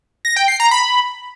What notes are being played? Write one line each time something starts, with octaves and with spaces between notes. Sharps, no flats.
A#6
G5
C7
A#5
B5